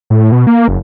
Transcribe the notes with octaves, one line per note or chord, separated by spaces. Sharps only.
A2
B2
A#3
F#1